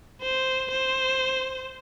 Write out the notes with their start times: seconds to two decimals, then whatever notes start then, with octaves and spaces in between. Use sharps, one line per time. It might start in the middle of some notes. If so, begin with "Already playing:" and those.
0.22 C5
0.71 C5